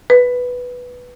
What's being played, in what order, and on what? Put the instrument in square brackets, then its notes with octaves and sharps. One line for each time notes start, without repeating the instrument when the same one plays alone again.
[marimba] B4